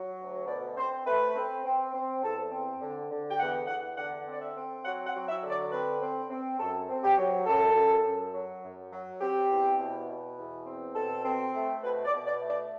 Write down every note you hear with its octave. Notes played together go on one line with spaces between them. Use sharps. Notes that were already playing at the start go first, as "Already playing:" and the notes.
Already playing: F#3
D2
B2 D5
C4 C5
A3 B4
C4
C4
C4
E2 A4
C4
D3
D3
G5
E2 F#5
E2 F#5
D3 F#5
C4 D5
E5
C4
F#3 F#5
F#5
F#3
E5
D3
D5
C4 B4
C4
C4
F#2 A4
C4
G4
F#3
F#2 A4
F#2
F#2
F#3
F#2
F#3
C4 G4
E2
B2
B2
E2
C4
B2 A4
C4
A3
B2 B4
D5
B2
D5
A3
D5